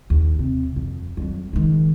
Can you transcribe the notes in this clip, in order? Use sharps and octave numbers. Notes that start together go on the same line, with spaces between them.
D#2
C3
F2
F2 F#3
D#3 G#3